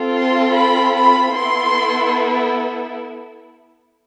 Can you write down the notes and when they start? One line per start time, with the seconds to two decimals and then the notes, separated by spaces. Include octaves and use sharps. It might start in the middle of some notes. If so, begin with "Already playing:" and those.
Already playing: C4 F4 A4
0.15 C6
0.55 B5
0.97 B5
1.36 B3 E4 A4 C6